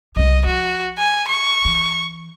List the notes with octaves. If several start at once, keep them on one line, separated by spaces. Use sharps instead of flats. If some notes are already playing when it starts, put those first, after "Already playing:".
C2 C#3 D#5
F3 F#4
G#5
C#6
E3